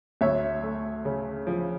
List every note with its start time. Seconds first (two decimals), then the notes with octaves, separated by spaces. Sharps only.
0.21 D2 C#5 E5
0.63 A3
1.05 C#3
1.47 F3